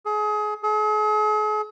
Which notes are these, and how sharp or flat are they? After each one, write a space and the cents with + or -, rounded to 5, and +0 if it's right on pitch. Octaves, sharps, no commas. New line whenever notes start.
G#4 +30
G#4 +45